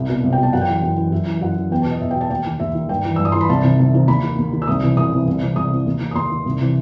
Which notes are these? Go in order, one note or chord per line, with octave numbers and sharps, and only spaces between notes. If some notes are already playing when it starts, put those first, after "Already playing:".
Already playing: C2
B2
C2
G5
B2
A5
F#2 F#5
G5
E3 F#5
F#2 G5
E3
F#2 E5
E3
F#2 F#5
E3
E2 G5
A5
B2
D#5
E2 E5
G5
B2
A5
D#2 G5
D#3
D#2 E5
D#3
G2 G5
E3
E6
G2
D#6
E3 C6
B5
C2 A5
C3 D#3
C2
C3 D#3
D#2 B5
D#3
D#2
D#3
E6
C2 D#6
C3 E3
C2 D#6
C3 E3
C2
C3 E3
C2 D#6
C3 E3
D#2
D#3
D#6
D#2 C6
D#3
C2
C3 E3